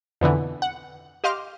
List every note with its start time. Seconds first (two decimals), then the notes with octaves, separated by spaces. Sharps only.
0.21 F2 B2 D3 E3
0.62 F#5
1.24 G4 D#5 F5 C6 D6 F6